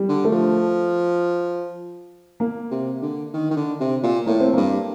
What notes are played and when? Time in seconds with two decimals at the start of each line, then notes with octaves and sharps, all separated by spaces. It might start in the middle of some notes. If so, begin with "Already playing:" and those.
Already playing: G3
0.09 D3
0.24 A3
0.32 F3
2.40 A#3
2.71 C3
3.02 D3
3.34 D#3
3.51 D#3
3.56 D3
3.80 C3
4.03 A#2
4.26 A2 A#3
4.40 C4
4.54 G2 A#3